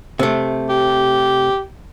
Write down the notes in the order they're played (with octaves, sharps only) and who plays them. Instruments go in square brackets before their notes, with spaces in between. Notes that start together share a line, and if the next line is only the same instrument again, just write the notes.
[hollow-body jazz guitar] C3 A3
[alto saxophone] G4